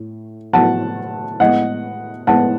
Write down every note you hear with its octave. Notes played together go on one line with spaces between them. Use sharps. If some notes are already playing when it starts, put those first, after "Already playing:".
Already playing: A2
A2 F#3 B3 F#5 A5
A2 G#3 B3 D#5 F#5
A2 G#3 B3 F#5 A5